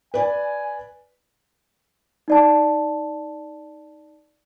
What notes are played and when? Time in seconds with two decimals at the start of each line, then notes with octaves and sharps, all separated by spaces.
0.14 B4 D5 G#5
2.28 D#4 D5 A5